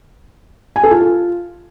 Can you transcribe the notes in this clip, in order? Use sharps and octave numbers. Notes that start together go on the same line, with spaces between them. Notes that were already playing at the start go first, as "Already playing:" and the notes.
G#5
A4
F4